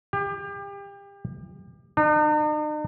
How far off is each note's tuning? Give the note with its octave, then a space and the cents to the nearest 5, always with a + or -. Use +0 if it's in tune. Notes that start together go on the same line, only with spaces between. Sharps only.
G4 +30
D#4 -45